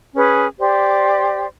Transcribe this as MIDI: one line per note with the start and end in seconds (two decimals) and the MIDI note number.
0.15 0.46 61
0.15 0.46 68
0.15 0.46 71
0.59 1.46 67
0.59 1.46 72
0.59 1.46 74